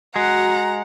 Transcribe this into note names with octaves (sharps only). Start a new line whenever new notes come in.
G#3 F#4 F#5 A#5